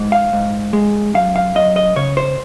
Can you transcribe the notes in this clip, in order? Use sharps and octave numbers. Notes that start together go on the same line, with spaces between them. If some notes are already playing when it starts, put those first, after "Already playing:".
Already playing: G#2
F5
G#2
G#3
F#2 F5
F5
F#2 D#5
D#5
C#3 C#5
C5